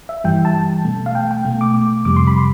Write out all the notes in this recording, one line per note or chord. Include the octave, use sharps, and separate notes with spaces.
E5
G2 E3 G3 G5
A5
B2 A3
F5
G5
G5
B2 A3
D6
F2 C3 G3 D6
C6
B5
C6